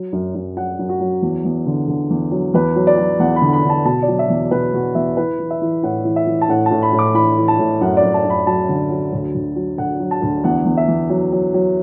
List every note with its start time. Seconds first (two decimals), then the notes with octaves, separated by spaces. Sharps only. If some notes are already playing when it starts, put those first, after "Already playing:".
Already playing: F#3
0.13 F#2
0.35 F#2
0.57 F#3 F#5
0.79 F#2
0.89 F#4
1.00 F#3
1.22 E2
1.45 E2
1.66 D3
1.88 D3
2.10 E2
2.32 F#3
2.54 E2 B4
2.76 F#3
2.87 D5
2.98 F#3
3.19 E2 F#5
3.36 B5
3.42 D3
3.53 B5
3.64 D3
3.70 A5
3.85 B2 A5
4.03 D5
4.08 F#3
4.19 E5
4.30 E2
4.51 B2 B4
4.73 B2 F#4
4.95 E2 E5
5.17 E3 B4
5.40 E3
5.50 E5
5.62 E3
5.83 A2 F#5
6.05 E3
6.16 E5
6.27 E3
6.41 A5
6.49 A2 F#5
6.66 A5
6.71 A2
6.82 B5
6.93 A2
6.99 D6
7.14 E3 B5
7.37 E3
7.48 A5
7.59 A2
7.81 F#2 F#5
7.97 D5
8.03 F#2
8.14 A5
8.25 F#2
8.30 B5
8.47 F#3 A5
8.69 D3
8.90 F#3
9.13 D2
9.35 D2
9.56 F#3
9.78 D2 F#5
10.00 F#3
10.11 A5
10.22 D2
10.44 E2 F#5
10.65 E2
10.77 E5
10.88 E2
11.10 F#3
11.32 F#3
11.54 F#3